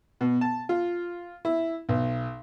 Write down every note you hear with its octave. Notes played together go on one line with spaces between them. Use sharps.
B2
A5
F4
E4
B1